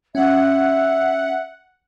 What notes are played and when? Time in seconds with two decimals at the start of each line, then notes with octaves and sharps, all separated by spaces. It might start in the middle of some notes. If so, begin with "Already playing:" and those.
0.15 C#4 E5 F#5